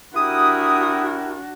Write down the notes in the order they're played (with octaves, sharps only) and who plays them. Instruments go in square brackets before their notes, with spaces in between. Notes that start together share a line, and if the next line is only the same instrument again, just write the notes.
[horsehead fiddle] D4 F#4 [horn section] E4 G4 A#4 [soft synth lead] D#6